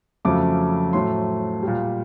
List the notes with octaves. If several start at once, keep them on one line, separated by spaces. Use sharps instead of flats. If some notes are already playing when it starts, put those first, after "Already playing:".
F2 C#3 F#3 A3 D6
A2 F#3 A3 C6
A#2 G3